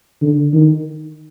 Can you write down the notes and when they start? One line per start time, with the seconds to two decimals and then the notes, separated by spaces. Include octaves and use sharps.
0.22 D3
0.54 D#3